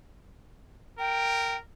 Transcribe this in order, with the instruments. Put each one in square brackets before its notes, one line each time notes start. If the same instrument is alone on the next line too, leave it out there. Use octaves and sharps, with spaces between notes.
[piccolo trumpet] A#4 [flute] G5